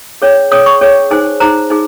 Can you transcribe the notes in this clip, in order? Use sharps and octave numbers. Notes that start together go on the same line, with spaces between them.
C#4 G#4 C#5
C#4 G#4 C#5 D#6
C#6
C#4 G#4 C#5
D#4 G#4 C5 G#5
D#4 G#4 C5 A#5
D#4 G#4